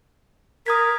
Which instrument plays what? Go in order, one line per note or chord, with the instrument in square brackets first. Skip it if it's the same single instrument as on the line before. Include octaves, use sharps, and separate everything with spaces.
[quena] A#4 [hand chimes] D#6 G#6 B6